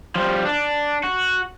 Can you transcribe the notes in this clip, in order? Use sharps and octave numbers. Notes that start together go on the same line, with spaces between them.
F3 G3
D4
F#4